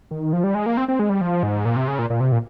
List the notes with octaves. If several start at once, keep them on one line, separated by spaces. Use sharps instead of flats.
D#3
F3
G3
G#3
A#3
C4
C4
G#3
G3
F3
G#2
A#2
C3
C#3
A#2
A#2
C3
A#2